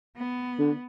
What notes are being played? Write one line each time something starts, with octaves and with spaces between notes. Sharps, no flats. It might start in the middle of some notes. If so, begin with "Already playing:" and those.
B3
D3